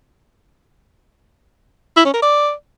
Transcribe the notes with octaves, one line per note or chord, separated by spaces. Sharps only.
E4
C#4
A#4
D5